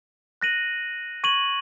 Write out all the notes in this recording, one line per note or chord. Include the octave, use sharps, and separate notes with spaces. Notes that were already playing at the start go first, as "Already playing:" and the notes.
F#6 A#6 D#7 F#7
C#6 G#6 D#7 F#7